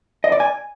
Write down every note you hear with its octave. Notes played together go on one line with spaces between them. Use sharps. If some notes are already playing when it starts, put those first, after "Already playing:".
D#5
D5
G#5